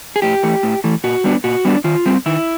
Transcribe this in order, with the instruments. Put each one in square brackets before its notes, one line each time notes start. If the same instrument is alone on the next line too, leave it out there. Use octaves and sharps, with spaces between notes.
[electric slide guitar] G#4
A2 G4
E3 A3
A2
E3 A3
A#2 F#4
G3 B3 D4
A#2 F#4
G3 B3 D4
D#3 F4
G3 C4
D#3 E4